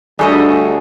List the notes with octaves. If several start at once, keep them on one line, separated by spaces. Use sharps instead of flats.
D2 G3 D4 G#4 A4 D#5 C#6 D#6